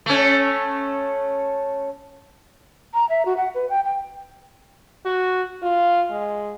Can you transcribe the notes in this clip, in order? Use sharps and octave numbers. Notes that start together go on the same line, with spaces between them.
A3 C#4
A#5
E5
F#4
F#5
B4
G5
G5
F#4
F4
G#3